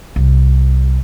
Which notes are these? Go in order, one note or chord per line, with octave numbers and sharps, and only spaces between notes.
C2